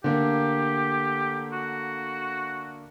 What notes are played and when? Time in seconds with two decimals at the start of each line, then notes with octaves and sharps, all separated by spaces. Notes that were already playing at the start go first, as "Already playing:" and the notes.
0.04 D3 A3 A#3 G4
1.52 F#4